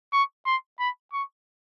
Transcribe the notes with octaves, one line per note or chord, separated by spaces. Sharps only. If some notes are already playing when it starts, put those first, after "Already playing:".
C#6
C6
B5
C#6